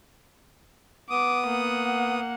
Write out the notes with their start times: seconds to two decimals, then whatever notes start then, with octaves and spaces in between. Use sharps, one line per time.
1.10 B3 D6 D#6
1.47 A#3 F#5